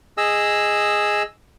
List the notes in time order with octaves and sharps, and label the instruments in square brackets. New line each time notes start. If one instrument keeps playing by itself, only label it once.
[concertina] G#4 D#5 E6